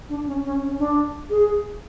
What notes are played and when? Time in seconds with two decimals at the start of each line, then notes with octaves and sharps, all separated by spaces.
0.09 D4
0.27 C#4
0.45 C#4
0.62 C#4
0.79 D4
1.30 G#4